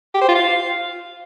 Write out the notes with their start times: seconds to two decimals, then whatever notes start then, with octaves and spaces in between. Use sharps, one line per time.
0.14 G4
0.21 C5
0.28 F4
0.36 F5